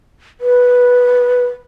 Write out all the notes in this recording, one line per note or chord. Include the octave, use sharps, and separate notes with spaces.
B4